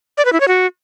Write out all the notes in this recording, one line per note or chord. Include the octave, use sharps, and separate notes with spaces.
D5
B4
E4
C#5
F#4